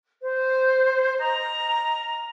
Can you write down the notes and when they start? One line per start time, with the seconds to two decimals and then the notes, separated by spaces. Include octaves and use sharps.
0.23 C5
1.18 D#5 A#5